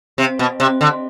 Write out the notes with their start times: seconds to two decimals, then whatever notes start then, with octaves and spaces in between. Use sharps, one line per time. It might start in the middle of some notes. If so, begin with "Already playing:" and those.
0.18 C3
0.39 B2
0.60 C3
0.81 D3